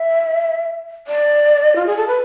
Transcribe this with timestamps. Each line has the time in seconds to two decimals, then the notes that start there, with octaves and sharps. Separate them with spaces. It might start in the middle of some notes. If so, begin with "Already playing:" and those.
Already playing: E5
1.07 D5
1.76 F4
1.86 G#4
1.97 A4
2.07 B4